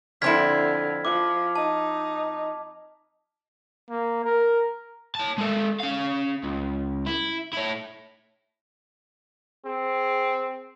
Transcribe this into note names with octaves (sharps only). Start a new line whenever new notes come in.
F2 D3 C4 E4 F6 G#6 B6
F3 D6
D#4 A5
A#3
A#4
C#5 A5
G#3 A4
C#4 F5
C#2
E4
E4 C#5
C4 G#4